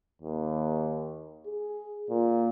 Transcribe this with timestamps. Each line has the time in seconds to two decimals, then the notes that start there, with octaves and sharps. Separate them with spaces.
0.22 D#2
1.46 G#4
2.10 A#2